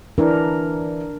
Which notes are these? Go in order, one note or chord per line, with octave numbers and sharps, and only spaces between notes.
E3 D4 A#4